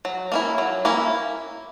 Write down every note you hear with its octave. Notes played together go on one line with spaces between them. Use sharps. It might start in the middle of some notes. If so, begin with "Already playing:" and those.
F#3
A#3 C#4 E4
F#3
A#3 C#4 E4